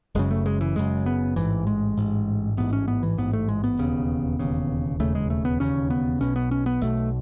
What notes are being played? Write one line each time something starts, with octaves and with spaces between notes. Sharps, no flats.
F#1 F#2 C#3 G#3
A3
G#3
E3
F#1 F#2 C#3 G#3
B3
A1 G#2 E3
G#3
A1 G#2
A1 G#2 B3
C#4
B3
E3
A1 G#2 B3
A3
G#3
B3
E1 D#2 C#3
E1 D#2 C#3
E1 D#2 C#3 A3
G#3
A3
B3
E1 D#2 C#3 C#4
B3
B1 B2 C#4
B3
C#4
B3
B1 B2 A3